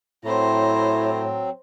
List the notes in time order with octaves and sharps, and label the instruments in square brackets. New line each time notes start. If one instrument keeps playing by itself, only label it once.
[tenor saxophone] A2 [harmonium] F#3 C4 [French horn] E4 [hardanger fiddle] C5 A#5